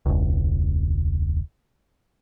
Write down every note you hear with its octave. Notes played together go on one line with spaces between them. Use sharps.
E1 C#2